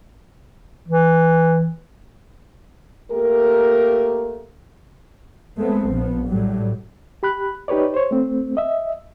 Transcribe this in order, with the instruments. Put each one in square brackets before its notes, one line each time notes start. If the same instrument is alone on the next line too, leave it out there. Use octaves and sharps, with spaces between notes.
[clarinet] E3
[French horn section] A3 A#3 G4 A#4
[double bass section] G#3 A3 B3 C4
A#1 F3 B3
A2 F#3 G3
[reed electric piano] G4 B5 F#6
D#4 G4 B4 C#5 D5
C5 C#5
A3 C4
D#5 E5